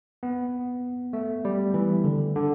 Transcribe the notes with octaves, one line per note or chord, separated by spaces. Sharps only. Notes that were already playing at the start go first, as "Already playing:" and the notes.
B3
A3
G3
E3
D3
D3